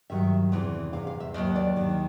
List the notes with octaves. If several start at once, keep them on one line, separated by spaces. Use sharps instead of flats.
G2 D#3 F#3 E5
E2 C3 E3
E2 C3 F5
F5
E5
D#2 D#3 F#3 D#5
D5
D#2 D#3 F#3